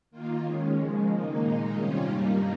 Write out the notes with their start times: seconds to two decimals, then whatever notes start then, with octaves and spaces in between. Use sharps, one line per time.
0.11 D#3 A#3 F4
0.43 D#3 G#3 C#4
0.76 C#3 F3 G#3
1.09 D#3 A#3 D#4
1.41 A#2 G#3 D#4
1.74 C3 D#3 G3 C#4 F4
2.06 G2 G3 A#3 D#4